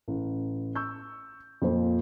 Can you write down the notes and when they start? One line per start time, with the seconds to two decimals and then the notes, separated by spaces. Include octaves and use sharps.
0.08 A1
0.75 C#6 E6 G6
1.62 F2 A#2 F3 C5